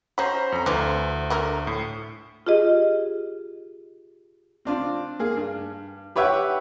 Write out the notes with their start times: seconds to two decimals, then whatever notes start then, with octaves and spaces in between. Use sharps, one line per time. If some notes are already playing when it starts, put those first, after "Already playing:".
0.18 C#4 F#4 C5 A#5 B5
0.52 F2 A#5
0.66 D2 D3 E3 F3
1.30 D3 A3 A#4
1.67 A2
2.46 F4 G4 G#4 D#5
4.65 C4 D4 F4
5.19 A#3 G#4
5.36 G2
6.16 G4 B4 C#5 E5 F#5 G5